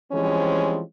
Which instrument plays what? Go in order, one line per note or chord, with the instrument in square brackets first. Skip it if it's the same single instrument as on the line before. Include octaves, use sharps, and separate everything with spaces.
[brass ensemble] E3 F3 G3 G#3 C4 C#4